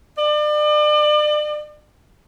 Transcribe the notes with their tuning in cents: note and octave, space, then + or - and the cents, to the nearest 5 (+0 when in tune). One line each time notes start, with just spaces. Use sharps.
D5 +35